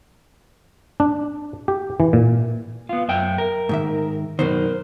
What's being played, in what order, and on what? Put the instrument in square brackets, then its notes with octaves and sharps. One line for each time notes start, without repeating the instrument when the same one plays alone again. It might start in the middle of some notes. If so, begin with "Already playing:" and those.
[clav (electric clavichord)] D4
G4
E3
A#2
[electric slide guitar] B3 F4
F#2 E5 G5
A#4
[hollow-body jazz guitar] G#2 D#3 E5
[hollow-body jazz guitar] F#2 B2 D#3 [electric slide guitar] A#4 C5